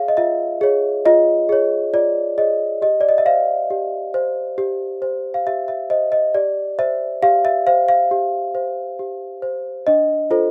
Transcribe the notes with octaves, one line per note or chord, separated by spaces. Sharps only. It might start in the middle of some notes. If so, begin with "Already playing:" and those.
Already playing: G#4 C#5 E5 F5
D#5
F4 E5
G#4 C#5
F4 D#5
G#4 C#5
F4 D5
G#4 C#5 D#5
G4 D#5
D5
D#5
E5
C5 F5
G4
C5
G4
C5
F5
G4 E5
E5
C5 D#5
D#5
G4 D5
C5 E5
G4 F5
E5
C5 F5
F5
G4
C5
G4
C5
D4 D#5
F4 A4 C5